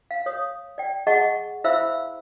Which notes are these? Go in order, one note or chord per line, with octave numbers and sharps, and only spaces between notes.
F5
C#5 D#6
D5 G5
G#4 D#5 F#5 A5 C#6
E4 C5 E5 F5 B5 E6